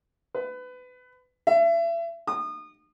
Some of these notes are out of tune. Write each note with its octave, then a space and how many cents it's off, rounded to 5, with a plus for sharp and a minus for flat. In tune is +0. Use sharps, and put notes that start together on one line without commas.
B4 +25
E5 +35
D#6 -30